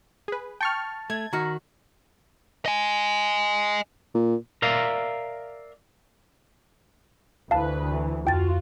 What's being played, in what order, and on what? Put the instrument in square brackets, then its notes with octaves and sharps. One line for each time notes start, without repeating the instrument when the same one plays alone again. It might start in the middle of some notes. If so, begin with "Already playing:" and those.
[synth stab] G#4 B4
[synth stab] G5 C#6 F6 [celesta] A5 A6
[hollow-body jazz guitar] A3 [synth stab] G#6
[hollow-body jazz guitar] D#3 F#4 [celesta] A#5 F6 A#6
[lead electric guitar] D#5 G#5
[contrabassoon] A#2
[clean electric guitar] A#4 D5 E5 F5 A#5
[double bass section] D2 [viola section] E3 B4 [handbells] F5 A5
[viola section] E3
[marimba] F2 A6 [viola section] F4 F#4 [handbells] G5